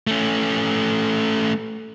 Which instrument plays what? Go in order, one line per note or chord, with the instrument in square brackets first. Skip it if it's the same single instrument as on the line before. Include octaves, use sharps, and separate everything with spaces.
[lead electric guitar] A3 C#4